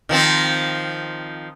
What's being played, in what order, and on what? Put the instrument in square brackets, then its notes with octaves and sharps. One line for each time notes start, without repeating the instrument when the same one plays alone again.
[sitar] D#3 F3 C4